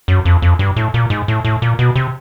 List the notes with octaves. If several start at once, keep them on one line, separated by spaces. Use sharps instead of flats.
F#2
F2
F2
G2
A2
A#2
G#2
A2
A2
A#2
B2
C3